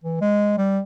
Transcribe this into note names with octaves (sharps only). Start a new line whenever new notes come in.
E3
G#3
G3